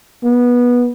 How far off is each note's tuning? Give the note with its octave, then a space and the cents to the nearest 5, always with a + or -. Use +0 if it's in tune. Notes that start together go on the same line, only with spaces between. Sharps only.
B3 -15